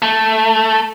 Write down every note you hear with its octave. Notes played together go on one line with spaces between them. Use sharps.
A3